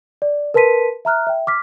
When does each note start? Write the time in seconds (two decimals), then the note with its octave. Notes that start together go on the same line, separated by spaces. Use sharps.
0.22 D5
0.54 A#4 B4 A5 C6 B6 D#7
1.05 E5 A#5 F6 F#6
1.27 E5 G5
1.47 D6 F6 B6